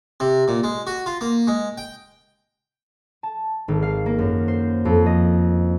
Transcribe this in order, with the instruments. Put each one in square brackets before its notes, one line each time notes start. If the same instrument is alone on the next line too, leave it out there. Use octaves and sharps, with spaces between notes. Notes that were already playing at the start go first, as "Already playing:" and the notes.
[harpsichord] C3
A#2
G#3
F#4
F4
A#3
G#3
G5
[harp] A5
G#1
F5
A#3
F#2
C5
F2
D#5